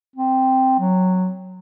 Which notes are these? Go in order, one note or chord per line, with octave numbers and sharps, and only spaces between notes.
C4
F#3